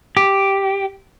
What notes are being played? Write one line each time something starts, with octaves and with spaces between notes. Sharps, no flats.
G4